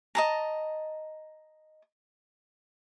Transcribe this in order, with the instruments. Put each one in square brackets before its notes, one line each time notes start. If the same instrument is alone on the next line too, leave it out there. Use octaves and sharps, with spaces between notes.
[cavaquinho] D#5 A5 A#5